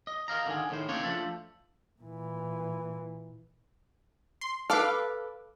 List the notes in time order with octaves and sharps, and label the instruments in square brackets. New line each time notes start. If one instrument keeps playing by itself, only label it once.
[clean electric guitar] D#5
A#4 D#5 F5 A#5
D3 D#3 G#4
A2 D#3 C5
C#3 A#3 C4 D4 D#4 C#5
F3 A3 D4 A4 C5
[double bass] A#2 E3
[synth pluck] C6
[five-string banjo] A4 B4 [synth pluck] F5 D6 F6